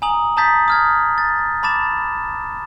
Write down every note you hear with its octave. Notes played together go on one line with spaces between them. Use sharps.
G#5 A#5 D#6 F#7
A5 A#5 D#6 G6 A6 B6
D#6 F6 G#6
A6
A5 B5 D6 A6 E7